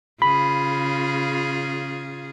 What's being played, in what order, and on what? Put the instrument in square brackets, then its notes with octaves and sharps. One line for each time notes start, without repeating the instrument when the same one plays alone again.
[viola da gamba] C#3 F4 G#4 [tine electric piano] B5